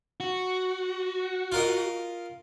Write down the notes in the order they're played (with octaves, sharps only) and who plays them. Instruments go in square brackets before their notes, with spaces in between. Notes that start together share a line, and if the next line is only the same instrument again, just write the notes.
[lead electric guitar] F#4
[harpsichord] F4 A#4 D#5